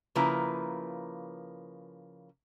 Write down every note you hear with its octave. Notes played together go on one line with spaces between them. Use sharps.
C#3 F3 A#3 E4 B4 A#5